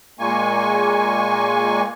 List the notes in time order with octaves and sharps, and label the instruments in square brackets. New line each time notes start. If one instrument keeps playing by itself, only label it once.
[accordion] A#2 G#3 A#3 G#5 C#6